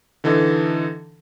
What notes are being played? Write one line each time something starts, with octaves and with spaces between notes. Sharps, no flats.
D3 E3 D#4 A4